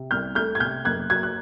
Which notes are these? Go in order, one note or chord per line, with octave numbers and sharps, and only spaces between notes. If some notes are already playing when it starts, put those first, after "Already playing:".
Already playing: C3
C2 F6 G6
A3 F6 G6
G#6
C3 F6 G6
F#1 F#6 G#6
F#3 F#6 G#6
F#6